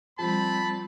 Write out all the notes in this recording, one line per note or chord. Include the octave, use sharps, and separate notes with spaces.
F3 G3 C4 A5 B5